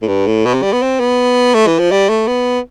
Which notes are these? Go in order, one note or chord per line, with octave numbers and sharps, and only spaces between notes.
A2
G2
A2
B2
C3
G3
B3
C4
B3
A3
E3
F3
G3
A3
B3